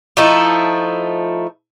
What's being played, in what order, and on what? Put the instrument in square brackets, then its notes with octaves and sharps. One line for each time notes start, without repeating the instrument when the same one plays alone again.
[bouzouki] F3 A3 D#4 E4